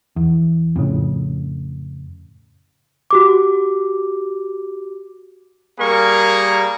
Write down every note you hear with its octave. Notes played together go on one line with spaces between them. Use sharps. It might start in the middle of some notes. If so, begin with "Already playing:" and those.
E2
F2 A2 C#3
F#4 G4 D6
G3 A#3 G#4 A#4 C#6